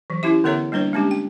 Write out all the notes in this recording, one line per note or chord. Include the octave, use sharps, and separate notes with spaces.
E3 F#3
C#4 E4 G4 E5
D3 B3 A4 C#5 E5 A#5
G3 A#3 D4 B4 C#5
G#3 A#3 C#4 D4 G4
G5